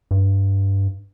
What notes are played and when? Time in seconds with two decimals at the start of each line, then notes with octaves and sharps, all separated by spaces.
0.11 G2